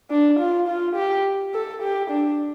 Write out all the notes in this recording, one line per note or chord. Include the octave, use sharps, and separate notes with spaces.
D4
F4
F4
G4
A4
G4
D4